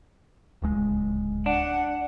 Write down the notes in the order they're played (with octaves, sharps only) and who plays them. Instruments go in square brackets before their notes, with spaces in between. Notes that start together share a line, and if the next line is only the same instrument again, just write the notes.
[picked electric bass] D1 C#2 G#3
[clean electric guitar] D4 [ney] F#5